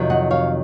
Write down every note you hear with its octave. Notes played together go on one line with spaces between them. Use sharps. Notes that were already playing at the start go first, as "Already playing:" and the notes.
Already playing: F2 C3 D#3 F#3
D#5 F#5
C#5 F5